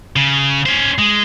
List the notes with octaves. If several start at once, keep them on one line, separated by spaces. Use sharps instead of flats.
C#3
C#4 C5
G#3